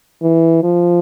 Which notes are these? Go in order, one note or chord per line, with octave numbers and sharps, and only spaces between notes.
E3
F3